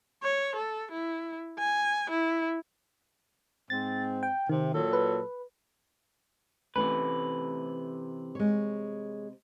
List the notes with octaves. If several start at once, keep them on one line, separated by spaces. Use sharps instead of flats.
C#5
A4
E4
G#5
E4
G#2 C4 A6
G5
C3 D#3
A#2 F#3 A4
B4
C3 E3 A3 C#4 B4
G#3 C#5